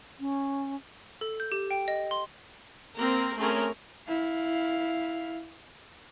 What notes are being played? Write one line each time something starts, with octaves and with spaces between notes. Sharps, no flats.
C#4
A4
G6
G4
G5
D#5
C6
A#3 C4 A#4
A3 C4 C#4 G#4 A#4
E4 F5